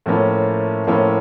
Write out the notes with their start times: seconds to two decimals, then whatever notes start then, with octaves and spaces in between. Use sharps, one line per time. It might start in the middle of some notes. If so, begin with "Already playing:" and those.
0.06 A2 F3 A#3 C#4 E4
0.87 A2 F3 A#3 C#4 E4